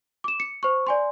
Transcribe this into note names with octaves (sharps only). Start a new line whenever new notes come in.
D6 E7
C#7
C5 C#6
D5 G#5 C6